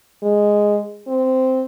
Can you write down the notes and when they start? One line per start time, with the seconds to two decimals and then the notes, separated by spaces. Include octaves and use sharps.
0.23 G#3
1.07 C4